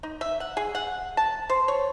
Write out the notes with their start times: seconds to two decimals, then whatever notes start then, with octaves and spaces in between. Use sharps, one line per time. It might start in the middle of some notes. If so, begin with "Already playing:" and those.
0.03 D#4
0.21 E5
0.40 F#5
0.57 G#4
0.75 F#5
1.17 A5
1.50 C5
1.68 C#5